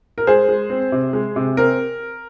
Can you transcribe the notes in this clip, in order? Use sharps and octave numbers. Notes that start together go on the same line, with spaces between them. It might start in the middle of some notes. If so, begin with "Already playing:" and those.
A#4
G#3 G#4 C5
G#3
C4
C3
G#3
C3
C4 A#4